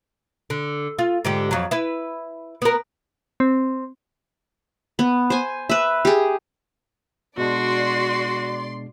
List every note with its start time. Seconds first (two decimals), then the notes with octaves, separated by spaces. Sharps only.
0.50 D3
0.99 F4
1.25 G#2 D3 G4
1.51 F2 F#3
1.71 E4 B4
2.62 B3 A#4
3.40 C4
4.99 B3
5.30 C5 G#5
5.69 B4 E5
6.05 G4 G#4
7.38 B2 G#3 D4 F#4 D5 C6